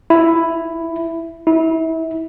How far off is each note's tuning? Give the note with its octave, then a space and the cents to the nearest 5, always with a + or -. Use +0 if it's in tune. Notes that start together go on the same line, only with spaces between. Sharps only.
E4 +5
E4 -30